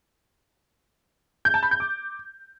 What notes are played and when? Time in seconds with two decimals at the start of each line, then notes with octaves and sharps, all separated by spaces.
1.45 G6
1.54 A5
1.63 B5
1.71 G6
1.80 D6